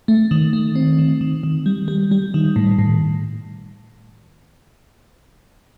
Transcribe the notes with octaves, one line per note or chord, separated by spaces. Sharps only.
A3
D#3
A3
C4
D#3
D#3
D#3
G3
G3
G3
D#3
A2
A2